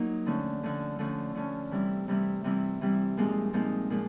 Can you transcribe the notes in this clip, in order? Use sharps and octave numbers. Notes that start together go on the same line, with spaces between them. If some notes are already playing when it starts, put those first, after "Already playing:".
Already playing: F#3 A#3 D#4
D3 F3 A3 C#4
D3 F3 A3 C#4
D3 F3 A3 C#4
D3 F3 A3 C#4
C3 E3 G3 C4 E4
C3 E3 G3 C4 E4
C3 E3 G3 C4 E4
C3 E3 G3 C4 E4
A#2 F3 G#3 C4 D#4
A#2 F3 G#3 C4 D#4
A#2 F3 G#3